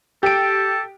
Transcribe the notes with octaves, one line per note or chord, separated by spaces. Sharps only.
G4 A4 D7